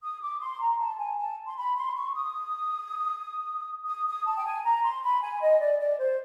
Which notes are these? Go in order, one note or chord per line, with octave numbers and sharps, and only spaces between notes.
D#6
D6
C6
A#5
A5
G#5
A5
C6
B5
C6
C#6
D#6
D#6
D#6
A5
G5
G#5
A#5
C6
B5
G#5
D#5
D5
D5
C5